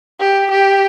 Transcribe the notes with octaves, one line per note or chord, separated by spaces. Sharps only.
G4
G4